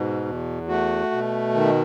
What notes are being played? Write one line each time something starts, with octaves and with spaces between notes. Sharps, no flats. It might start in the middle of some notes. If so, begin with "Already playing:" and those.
Already playing: G#2 B2
E2
A3 F#4
B2
D#3